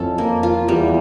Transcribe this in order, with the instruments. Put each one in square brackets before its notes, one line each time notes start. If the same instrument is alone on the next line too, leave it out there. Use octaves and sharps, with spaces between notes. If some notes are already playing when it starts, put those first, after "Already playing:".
Already playing: [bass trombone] F2 [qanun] C#4 E4 A4
[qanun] A#3
F4
[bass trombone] E2 [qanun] G3